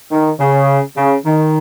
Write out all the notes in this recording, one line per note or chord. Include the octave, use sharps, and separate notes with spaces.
D#3
C#3
C#3
D#3